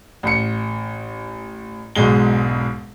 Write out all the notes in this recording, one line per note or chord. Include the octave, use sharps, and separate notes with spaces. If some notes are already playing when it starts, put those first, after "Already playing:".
A1 C#7
E1 B1 G#2 G#3 G7